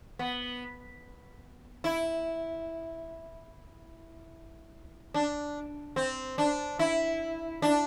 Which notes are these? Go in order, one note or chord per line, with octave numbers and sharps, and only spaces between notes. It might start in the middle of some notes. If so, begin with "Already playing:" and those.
B3
E4
D4
C4
D4
E4
D4